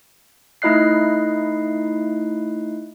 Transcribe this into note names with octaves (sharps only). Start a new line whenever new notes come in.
A3 D#4 E4 D#5 F#6 C7